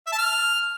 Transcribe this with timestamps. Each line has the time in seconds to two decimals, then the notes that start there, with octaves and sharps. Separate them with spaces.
0.07 E5
0.12 A5
0.18 F6